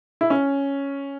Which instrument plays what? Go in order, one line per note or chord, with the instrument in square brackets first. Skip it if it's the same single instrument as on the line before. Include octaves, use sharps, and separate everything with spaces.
[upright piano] E4
C#4